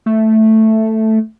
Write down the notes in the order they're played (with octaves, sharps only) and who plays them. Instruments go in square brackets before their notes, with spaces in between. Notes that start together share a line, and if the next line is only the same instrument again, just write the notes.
[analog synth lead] A3